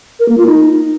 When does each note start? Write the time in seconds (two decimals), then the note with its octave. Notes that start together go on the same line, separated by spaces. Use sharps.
0.19 A#4
0.28 A#3
0.37 F4
0.47 D#4